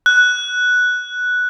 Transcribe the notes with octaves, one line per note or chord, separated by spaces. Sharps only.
F#6